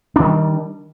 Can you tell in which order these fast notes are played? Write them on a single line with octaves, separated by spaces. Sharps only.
D4 D#3 G3